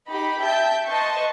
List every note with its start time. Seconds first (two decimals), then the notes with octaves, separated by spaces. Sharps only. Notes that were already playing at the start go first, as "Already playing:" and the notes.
0.10 D#4 G4 B5
0.40 E5 G5 A5 G6
0.88 B4 D#5 A5 C6 C#6